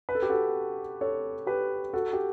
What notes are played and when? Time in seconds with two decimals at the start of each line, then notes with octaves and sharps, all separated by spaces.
0.09 B4
0.15 A4
0.22 G4
0.29 F#4 A4
1.01 A4 C#5
1.47 G4 B4
1.93 F#4 A4
2.13 G4